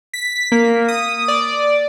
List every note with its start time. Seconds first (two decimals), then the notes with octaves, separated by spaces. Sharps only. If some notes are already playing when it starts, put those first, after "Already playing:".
0.14 B6
0.52 A#3
0.88 D#6
1.28 D5